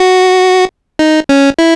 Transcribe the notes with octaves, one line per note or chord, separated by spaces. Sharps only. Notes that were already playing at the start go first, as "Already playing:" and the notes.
Already playing: F#4
D#4
C#4
E4